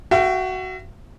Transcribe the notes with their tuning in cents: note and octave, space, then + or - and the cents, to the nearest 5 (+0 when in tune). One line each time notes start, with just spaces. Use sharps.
F#4 +10 E5 +40 G5 -10